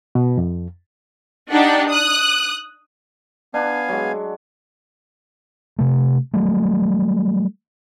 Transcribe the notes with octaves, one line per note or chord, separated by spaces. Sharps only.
B2
F2
D4 D#4 G4 F#5
D#6 F#6
B3 D4 F5 G#5
F#3 G#3
C3 A3
F#3 G3 A3